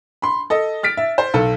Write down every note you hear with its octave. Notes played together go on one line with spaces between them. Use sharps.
B5 C6
A4 D#5
F6 A6 B6 D7
E5
C5
B1 A4